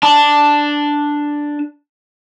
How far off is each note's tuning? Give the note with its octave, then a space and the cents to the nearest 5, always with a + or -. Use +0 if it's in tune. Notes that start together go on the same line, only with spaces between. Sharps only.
D4 +0 A5 +0